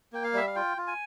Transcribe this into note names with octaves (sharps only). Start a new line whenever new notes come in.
A#3 G5
F5
G3 E5
F5
F4 G5
F4
G#5